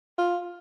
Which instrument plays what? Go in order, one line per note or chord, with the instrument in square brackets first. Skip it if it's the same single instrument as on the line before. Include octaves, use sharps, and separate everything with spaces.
[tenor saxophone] F4